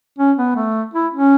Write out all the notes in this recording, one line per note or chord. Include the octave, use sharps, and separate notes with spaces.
C#4
B3
A3
E4
C#4